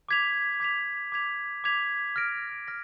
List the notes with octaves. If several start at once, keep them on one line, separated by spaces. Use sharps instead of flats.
D6 G#6 B6 F7
D6 G#6 B6 F7
D6 G#6 B6 F7
D6 G#6 B6 F7
F6 A#6 D7
F6 A#6